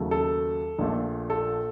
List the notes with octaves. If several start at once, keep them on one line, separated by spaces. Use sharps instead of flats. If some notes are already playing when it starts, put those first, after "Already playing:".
Already playing: D#2 C#3 F#3 A3
A4
A#1 A#2 A3
A4